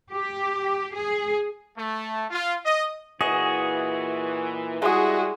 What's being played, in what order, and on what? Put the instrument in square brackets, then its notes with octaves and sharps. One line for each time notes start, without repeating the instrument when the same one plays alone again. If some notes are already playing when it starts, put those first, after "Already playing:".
[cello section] G4
G#4
[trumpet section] A3
F4
D#5
[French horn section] A#2 E3 [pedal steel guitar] F#4 G#4 [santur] D#5
[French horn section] G3 E4 [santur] G#3 D#6 [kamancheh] F#4 G#4